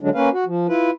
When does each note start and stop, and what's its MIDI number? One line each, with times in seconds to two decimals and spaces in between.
0.01 0.09 50
0.01 0.09 54
0.01 0.09 56
0.01 0.09 62
0.15 0.29 58
0.15 0.29 61
0.15 0.29 71
0.15 0.29 77
0.33 0.44 66
0.46 0.67 53
0.69 0.90 64
0.69 0.90 65
0.69 0.90 71